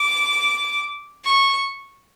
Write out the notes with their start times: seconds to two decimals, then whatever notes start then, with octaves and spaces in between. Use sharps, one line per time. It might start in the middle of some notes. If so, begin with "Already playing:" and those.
Already playing: D6
1.25 C#6